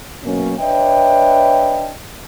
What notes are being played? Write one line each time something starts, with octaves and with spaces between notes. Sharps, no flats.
F#2 B2 F#3 A#3 C#4
D4 B4 C#5 D#5 E5 G5